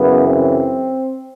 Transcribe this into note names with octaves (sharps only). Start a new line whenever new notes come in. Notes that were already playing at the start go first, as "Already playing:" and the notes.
Already playing: F#2 C#3 E3 B3
C4